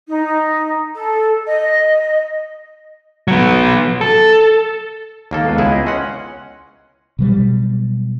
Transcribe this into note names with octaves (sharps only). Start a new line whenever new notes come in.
D#4
A4
D#5
F#3 B3
A4
D#2 A#3 A4
G#3 B3 F4
C#2 E4 G#4
D#5
C#4 F#5 C6
B2 F#3 G3